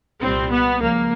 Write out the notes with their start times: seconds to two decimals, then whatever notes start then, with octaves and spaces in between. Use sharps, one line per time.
0.21 C2 A#2 G3 C4
0.50 B3
0.80 C#2 C#3 F3 A#3